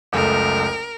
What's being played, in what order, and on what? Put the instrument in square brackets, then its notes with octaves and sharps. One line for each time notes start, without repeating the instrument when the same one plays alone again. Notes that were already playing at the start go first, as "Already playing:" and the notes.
[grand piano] F#1 C#2 A3 [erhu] A#4